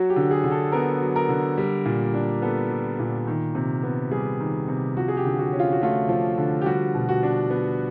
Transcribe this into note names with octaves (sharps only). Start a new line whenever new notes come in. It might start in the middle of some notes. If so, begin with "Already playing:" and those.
Already playing: F#3 F#4
G4
D3
G#4
D3
A4
B3 A#4
F#3
A#4
D3
G3
A#2
D4
B3 A4
G3
A#2
D#3
C3
B3
G3 G#4
D#3
C3
F3 F#4
G#4
G4
D3
F#4
C#4
F4
F#4
A3 F4
F3
D3
G4
G3 F#4
B2
F#4
D4
B3